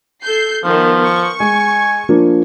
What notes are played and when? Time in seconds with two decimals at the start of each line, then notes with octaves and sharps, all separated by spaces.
0.22 A4 G6 C7
0.64 D#3 F3 B3
1.05 C#6
1.40 G#3 G#5
2.09 F3 A#3 D4